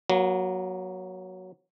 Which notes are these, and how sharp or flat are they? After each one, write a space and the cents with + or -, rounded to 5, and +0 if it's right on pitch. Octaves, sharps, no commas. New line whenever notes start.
F#3 +0 A#3 +40